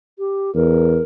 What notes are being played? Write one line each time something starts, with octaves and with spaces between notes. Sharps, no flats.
G4
E2 A#4